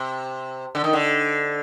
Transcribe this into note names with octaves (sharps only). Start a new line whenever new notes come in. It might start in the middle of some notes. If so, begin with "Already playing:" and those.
Already playing: C3
D3
D#3
D3